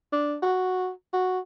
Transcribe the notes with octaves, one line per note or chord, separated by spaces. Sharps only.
D4
F#4
F#4